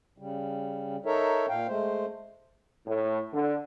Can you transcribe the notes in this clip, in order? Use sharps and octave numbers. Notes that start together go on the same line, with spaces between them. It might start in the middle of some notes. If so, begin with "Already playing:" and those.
C#3 G3
D#4 A4 A#4 C#5 E5
A#2 F5 G5
G#3 A3 C5
A2
D3